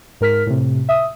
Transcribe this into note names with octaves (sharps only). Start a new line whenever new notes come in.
G#2 A#4 F6 B6
A2 C3
E5 D#6